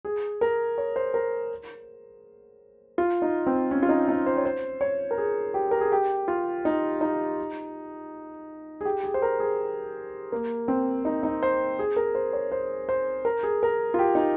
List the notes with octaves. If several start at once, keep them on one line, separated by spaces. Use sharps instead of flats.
G#4
A#4
C#5
C5
A#4
F4
D#4
C4
C#4
F4
D#4
D#4
C5
C#5
C5
C#5
A#4
G#4
G4
A#4
G#4
G4
F4
D#4
D#4
G#4
G4
G#4
C5
A#4
G#4
A#3
C4
D#4
D#4
C5
G#4
A#4
C5
C#5
C5
C5
A#4
G#4
A#4
F4
G4
D#4